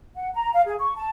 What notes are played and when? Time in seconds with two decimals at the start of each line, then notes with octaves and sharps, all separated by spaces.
0.14 F#5
0.34 A#5
0.53 F5
0.66 G#4
0.79 C#6
0.96 A5